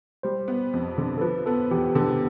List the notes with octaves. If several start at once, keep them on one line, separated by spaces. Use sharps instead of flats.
G3 C5
B3
F2
D3
A4
F3 B4
B3 A4
E2 G4
D3 A4